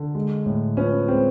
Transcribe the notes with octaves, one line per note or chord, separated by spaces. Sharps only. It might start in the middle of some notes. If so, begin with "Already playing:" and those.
Already playing: D3
G#3
A2
F3 B3 C#4
G#3 C4